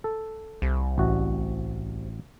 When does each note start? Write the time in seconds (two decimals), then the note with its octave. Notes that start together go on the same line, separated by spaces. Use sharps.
0.04 A4
0.62 C2
0.98 A1 F#4